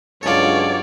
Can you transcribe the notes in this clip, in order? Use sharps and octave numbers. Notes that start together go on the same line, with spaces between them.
C#2 G2 F#3 F4 A4 C#5 D5